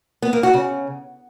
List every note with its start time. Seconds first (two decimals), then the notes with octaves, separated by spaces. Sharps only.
0.22 B3
0.33 A#3
0.43 F#4
0.54 C#3